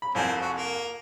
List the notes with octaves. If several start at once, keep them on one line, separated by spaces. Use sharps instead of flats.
B5
C2 F2 A#3 C4 G#5
F#4
A#3